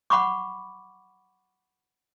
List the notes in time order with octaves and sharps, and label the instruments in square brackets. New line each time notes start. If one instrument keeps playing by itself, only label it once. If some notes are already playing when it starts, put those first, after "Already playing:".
[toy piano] F#5 B5 C#6 D6